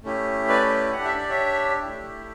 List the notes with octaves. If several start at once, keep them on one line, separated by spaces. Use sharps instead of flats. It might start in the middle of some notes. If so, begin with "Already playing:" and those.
A3 C#4 E4 G4
B4 D5
D4 G4 F#5
E5
D5
C#5 E5
A3 E4 G4